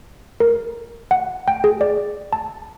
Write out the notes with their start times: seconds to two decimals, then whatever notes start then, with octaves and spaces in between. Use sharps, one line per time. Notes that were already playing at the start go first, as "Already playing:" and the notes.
0.40 A#4
1.11 F#5
1.48 G5
1.64 G#4
1.81 D5
2.33 A5